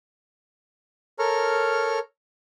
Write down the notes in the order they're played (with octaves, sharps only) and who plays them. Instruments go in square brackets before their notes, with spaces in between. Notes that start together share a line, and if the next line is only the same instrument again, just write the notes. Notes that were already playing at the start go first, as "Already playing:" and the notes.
[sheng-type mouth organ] A4 A#4 C#5 A#5 F6